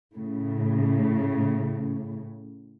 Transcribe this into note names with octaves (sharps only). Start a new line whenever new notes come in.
A2 C#3